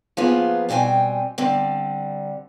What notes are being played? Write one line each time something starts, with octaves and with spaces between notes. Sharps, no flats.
F3 A#3 B3 F4 G#4 B4
B2 G3 C4 G5 G#5
D3 G3 C4